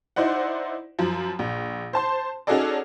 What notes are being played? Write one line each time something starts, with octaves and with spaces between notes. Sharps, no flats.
D#4 E4 C5 D5 F#5
F#2 F3
A#1
C5 A5 C6
C#4 D#4 F#4 G#4 A4 D5